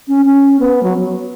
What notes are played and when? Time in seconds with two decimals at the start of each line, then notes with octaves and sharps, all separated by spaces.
0.08 C#4
0.25 C#4
0.60 B3
0.83 F#3